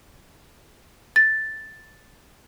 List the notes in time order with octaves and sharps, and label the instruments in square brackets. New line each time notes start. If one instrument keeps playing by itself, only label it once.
[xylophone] A6